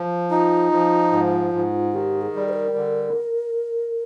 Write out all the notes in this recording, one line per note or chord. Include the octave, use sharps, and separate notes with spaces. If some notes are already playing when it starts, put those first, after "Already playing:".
Already playing: F3
D#4 F4
F3
G#2
G#2
D#3 G4
G#4
G3
C5
A#4
D3